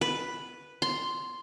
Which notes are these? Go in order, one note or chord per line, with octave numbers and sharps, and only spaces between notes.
B4
C6